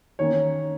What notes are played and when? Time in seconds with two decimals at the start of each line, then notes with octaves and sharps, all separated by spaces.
0.19 D#3 A#3 C#4 C#5